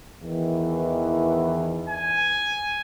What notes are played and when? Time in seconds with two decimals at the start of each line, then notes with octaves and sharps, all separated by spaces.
0.22 E2 D#3 E3
1.89 G#5